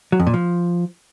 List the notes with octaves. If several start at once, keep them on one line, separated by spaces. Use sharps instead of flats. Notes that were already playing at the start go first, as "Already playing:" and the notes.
F#3
F2
A#2
F3